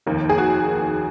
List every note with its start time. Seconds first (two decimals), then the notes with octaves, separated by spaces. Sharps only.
0.06 F1 D#2 D#3 A#3
0.29 G#4
0.38 F#4